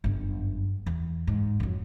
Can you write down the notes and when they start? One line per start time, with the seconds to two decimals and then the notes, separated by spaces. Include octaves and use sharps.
0.04 G1 F#2
0.86 E2
1.27 G#2
1.60 F2 F#3